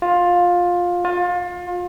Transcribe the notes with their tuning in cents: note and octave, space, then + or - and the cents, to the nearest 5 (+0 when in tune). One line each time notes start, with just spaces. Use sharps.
F4 +15
F4 +30